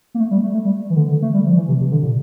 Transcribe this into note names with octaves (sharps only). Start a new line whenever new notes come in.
A#3
A3
G3
A3
A3
G3
E3
D3
D3
A3
G3
F3
E3
C3
C3
D3
A#2